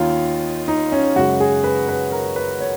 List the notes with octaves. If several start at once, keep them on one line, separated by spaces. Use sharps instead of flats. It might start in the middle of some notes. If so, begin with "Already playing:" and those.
Already playing: D#2 D#3 C#4 D#4 F4
D#4
C#4
F#2 C#3 G#3 F#4
G#4
B4
B4
A#4
B4
C#5